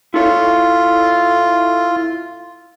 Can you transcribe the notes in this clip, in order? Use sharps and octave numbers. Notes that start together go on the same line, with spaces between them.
E4 F4 A4 C#5